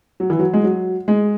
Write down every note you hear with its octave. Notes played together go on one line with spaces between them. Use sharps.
F#3
E3
F#3
G#3
F#3
G#3